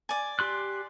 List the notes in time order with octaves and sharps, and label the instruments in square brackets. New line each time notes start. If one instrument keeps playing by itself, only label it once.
[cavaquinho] D5 G#5
[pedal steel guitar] G4 C6 F#6